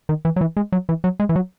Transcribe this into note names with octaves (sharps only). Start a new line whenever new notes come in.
D#3
E3
F#3
E3
G#3
F#3
E3
F#3
G#3
E3
F#3